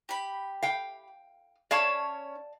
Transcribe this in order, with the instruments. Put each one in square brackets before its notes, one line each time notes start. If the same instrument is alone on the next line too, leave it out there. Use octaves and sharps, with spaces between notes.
[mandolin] G4 B5
[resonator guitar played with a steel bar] F5 G5
[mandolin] C#4 C#5 [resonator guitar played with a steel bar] D5 F5 A5